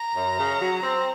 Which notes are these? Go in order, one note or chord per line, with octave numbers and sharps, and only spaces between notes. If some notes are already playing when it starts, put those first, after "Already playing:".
Already playing: A#5
F#2
C#3
F#3
C4